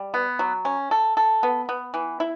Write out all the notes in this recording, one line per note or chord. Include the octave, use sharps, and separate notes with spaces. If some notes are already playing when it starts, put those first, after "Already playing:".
Already playing: G3
B3
F#3
C#4
A4
A4
B3
B3
E3
E4